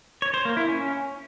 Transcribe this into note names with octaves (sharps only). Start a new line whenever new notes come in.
C#5
C5
A#3
E4
C#4